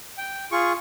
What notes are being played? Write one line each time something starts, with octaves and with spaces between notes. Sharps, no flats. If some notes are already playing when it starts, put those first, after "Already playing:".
G5
F4 G#4 C#6